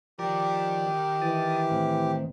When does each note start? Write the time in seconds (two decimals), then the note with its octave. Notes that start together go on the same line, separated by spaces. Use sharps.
0.19 D#3 F3 G4 A#4 D5
1.22 E3 A5 D#6
1.71 A2 C4